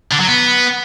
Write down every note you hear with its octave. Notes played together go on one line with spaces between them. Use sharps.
D3
F#3
B3